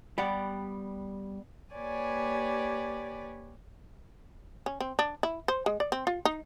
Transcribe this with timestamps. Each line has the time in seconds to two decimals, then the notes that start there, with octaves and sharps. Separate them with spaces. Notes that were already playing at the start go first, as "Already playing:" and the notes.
0.18 G3 B3 G4 D5 F#5
1.74 A#3 G4 B4 C#5 D5 G#5
4.66 C#4
4.80 C4
4.99 D4
5.23 E4
5.48 C5
5.66 G#3
5.80 D5
5.92 C4
6.07 F4
6.25 D#4